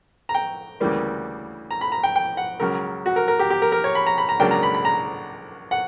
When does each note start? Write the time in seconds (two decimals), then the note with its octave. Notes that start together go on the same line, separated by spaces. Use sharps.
0.29 A#5
0.34 G5
0.80 D2 C#3 E3 G3 A#3
1.71 A#5
1.81 B5
1.92 A#5
2.03 G5
2.16 G5
2.37 F#5
2.60 C#2 C#3 F#3 A#4
3.06 F#4
3.16 A#4
3.28 A#4
3.39 G4
3.50 G4
3.62 A#4
3.72 A#4
3.84 C#5
3.95 B5
4.07 A#5
4.18 B5
4.29 A#5
4.40 C#2 C#3 F#3 A#3 D4 G5
4.51 A#5
4.63 B5
4.75 B5
4.85 A#5
5.71 F#5